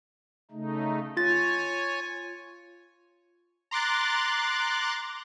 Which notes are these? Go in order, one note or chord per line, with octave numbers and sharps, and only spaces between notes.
C#3 A3 D#4
F4 C#5 G#5 A6
A#5 C6 D6 F#6 A6